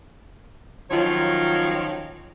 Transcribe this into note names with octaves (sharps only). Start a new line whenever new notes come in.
D#3 F3 F#3 C#4 F4 C#5